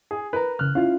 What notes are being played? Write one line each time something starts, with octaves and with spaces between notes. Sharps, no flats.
G#4
A#4 B4 A#5
C#3 F6 F#6
C#4 E4 F4 F5